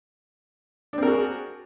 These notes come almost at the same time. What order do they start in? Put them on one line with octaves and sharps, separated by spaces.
D4 C4 A#4 F#4 G#4